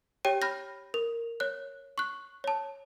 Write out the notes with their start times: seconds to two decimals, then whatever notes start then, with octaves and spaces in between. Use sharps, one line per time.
0.25 G4 C#5 G5 D#7
0.42 B5 F6 G6 A#6
0.94 A#4
1.40 C#5 F#6
1.98 C#6 F#6
2.44 C#5 A5